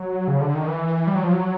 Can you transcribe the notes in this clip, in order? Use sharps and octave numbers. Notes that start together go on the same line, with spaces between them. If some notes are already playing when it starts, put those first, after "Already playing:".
Already playing: F#3
C#3
D3
D#3
E3
G3
F#3
F3
F#3